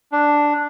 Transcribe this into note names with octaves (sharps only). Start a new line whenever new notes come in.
D4